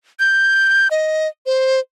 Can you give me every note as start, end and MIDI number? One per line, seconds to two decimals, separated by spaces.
0.19 0.88 91
0.91 1.28 75
1.46 1.80 72